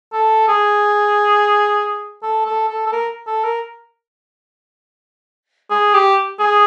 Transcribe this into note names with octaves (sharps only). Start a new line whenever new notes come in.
A4
G#4
A4
A4
A4
A4
A#4
A4
A#4
G#4
G4
G#4